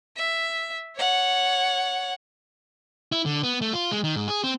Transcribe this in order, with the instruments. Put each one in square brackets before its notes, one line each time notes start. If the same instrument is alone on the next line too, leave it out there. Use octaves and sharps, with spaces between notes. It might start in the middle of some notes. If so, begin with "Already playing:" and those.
[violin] E5
C#5 F#5
[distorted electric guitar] E4
D3
B3
A3
F4
G#3
D#3
G#2
G#4
C4